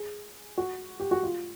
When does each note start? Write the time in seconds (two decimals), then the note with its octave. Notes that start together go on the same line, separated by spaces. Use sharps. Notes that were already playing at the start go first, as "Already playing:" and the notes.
Already playing: G#4
0.58 F#4
1.00 G4
1.11 F#4
1.23 F4